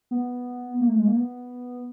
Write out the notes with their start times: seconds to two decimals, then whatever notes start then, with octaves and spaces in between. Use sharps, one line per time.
0.11 B3
0.81 A#3
0.89 A3
0.98 G#3
1.07 A#3
1.16 B3